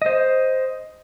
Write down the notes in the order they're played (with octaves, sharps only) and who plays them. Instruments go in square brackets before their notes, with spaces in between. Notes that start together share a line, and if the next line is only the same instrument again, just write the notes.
[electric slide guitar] C5 D#5